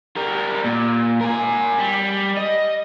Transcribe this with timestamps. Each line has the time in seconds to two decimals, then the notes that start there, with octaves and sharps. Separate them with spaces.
0.16 G3 A#4
0.65 A#2
1.21 A#4 G#5
1.79 G3
2.37 D#5